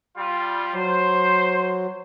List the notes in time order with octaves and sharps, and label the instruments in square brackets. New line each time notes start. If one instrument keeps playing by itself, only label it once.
[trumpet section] G3 F4
[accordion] F#3 [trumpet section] C5